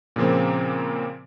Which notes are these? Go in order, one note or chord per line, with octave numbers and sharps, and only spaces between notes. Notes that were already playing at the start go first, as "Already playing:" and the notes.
A#2 C#3 F3 A#3 C4